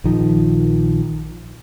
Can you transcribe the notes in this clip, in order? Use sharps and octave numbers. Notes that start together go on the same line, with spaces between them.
A#1 D#3 F3